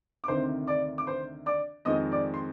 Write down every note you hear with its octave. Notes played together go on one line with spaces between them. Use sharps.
D6
D2 C3 D#3 C5 C6
D5 D6
D6
C5 C6
D5 D6
F2 D#3 G#3 C4 D#5 D#6
D5 D6
C6